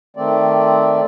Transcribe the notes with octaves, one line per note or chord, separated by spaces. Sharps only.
D#3 A3 C4 D5